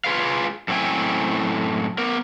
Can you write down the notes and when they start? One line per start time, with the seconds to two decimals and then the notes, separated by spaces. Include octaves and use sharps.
0.05 F4 G#4 B4 F5
0.68 F#2 A2 C4 E4 G5 G#5
1.98 B3 A#4